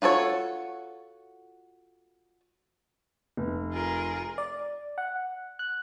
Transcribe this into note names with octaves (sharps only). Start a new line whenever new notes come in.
F4 F#4 A4 C#5
F1
F4 G#4 A#4
D5
F#5
F#6